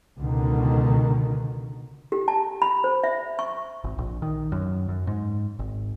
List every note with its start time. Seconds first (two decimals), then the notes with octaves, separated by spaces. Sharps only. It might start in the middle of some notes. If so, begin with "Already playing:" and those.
0.18 C#2 B2 D3 D#3
2.12 G4
2.28 A5
2.62 B5
2.84 C5
3.04 E5
3.39 C#6
3.84 G#1
3.98 A#1
4.22 D#3
4.52 F#2
4.89 F#2
5.07 G#2
5.59 G#1